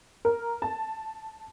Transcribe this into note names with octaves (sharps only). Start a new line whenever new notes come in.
A#4
A5